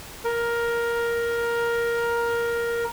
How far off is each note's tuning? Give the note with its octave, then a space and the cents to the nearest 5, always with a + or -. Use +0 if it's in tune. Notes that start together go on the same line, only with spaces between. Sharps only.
A#4 +10